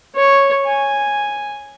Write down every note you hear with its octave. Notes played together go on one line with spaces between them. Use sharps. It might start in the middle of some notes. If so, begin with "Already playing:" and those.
C#5
G#5